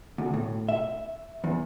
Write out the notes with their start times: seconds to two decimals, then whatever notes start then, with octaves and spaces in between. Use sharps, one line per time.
0.18 D2
0.34 A2
0.69 E5
1.44 E2